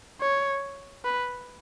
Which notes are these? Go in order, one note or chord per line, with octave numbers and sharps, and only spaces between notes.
C#5
B4